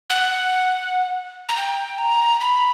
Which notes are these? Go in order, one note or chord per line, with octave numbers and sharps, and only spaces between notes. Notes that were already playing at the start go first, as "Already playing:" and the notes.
F#5
A#5
G5
A#5
B5